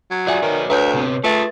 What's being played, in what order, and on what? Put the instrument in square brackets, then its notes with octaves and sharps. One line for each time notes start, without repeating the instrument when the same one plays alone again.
[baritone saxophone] F#3
[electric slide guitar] F4 F#4 G#4 [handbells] D5 E5 G#5
[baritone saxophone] D#3 [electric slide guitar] F#4 B4 C#5
[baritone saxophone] D2 [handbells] B4 C#5 G6 [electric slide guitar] E5
[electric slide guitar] C3 B3 C4
[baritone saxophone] A3 [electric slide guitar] F4 G#4 [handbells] B4 E5 A6